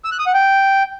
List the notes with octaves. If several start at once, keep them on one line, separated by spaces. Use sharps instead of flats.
E6
F#6
D#6
F#5
G5